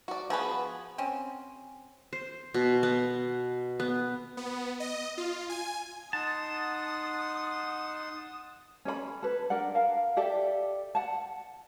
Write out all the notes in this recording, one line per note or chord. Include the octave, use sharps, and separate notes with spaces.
F#4 D5
F3 B3 F#4 G#4 B4
C4 C#4
C5
B2
B3
B3
B3
D#5
F4
G#5
D#4 F#5 A5 C6 D#6
C#4 A4 D5 B5
A4 B4
D4 A#4 D5 F#5
A#4 F5 A5
G4 A4 D5 E5
F#5 A5